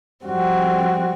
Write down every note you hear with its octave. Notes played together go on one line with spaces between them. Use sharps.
F2 G3 C4 F#4